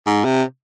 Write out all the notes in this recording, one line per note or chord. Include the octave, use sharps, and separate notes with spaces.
G#2
C3